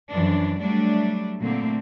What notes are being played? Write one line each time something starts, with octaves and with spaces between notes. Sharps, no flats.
F#2 E3 F3 D4
F#3 G3 A3 D4
A#2 D3 A3 A#3 C4